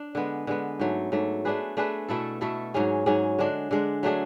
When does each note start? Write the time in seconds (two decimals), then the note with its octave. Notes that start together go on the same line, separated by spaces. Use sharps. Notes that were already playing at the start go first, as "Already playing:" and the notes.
Already playing: D4
0.15 D3 G#3 B3
0.47 D3 G#3 B3
0.80 G#2 F#3 A3
1.12 G#2 F#3 A3
1.45 A3 D4 G#4 B4
1.77 A3 D4 G#4 B4
2.09 B2 A3 E4 A4
2.41 B2 A3 E4 A4
2.74 G#2 F#3 C#4 G#4
3.06 G#2 F#3 C#4 G#4
3.39 D3 G#3 D4
3.71 D3 G#3 D4
4.03 F#3 A3 D4 G#4